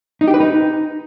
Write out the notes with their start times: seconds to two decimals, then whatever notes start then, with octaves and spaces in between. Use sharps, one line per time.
0.21 D#4
0.27 G4
0.34 B4
0.40 D#4